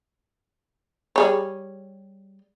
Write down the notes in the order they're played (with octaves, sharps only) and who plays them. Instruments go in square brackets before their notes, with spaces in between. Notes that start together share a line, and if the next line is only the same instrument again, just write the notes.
[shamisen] G3 G#4 C#5